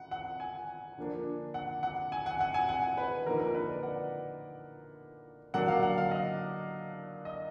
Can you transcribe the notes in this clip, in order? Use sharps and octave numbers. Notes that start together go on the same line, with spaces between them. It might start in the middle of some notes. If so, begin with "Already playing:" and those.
Already playing: F#5
F#5
G#5
D3 F3 A#3 D4
F#5
F#5
G#5
F#5
F#5
G#5
F#5
B4
D3 F3 A#3 D#4 A#4
A#4
B4
D5
F#5
D3 F#3 A#3 D4 F#5
F5
F#5
F5
D#5
D#5